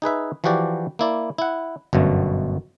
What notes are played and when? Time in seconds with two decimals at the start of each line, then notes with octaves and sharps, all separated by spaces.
0.02 D#4 G#4 B4 E5
0.44 E3 F3 E4 F#4 G4 D5
0.99 A#3 E4 D5
1.38 E4 F#5
1.93 G1 F#2 B2 A3